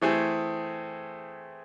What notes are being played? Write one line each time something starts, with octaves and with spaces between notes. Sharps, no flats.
E3 A3 C4 G#4